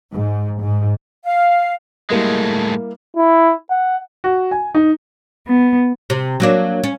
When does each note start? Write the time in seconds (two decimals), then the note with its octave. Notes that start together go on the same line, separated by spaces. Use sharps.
0.12 G#2
0.62 G#2
1.26 F5
2.10 A2 G3 G#3 A#3 E4
3.17 E4
3.70 F#5
4.24 F#4
4.51 G#5
4.75 D#4
5.47 B3
6.10 C3
6.40 F#3 A#3 D4
6.83 C#4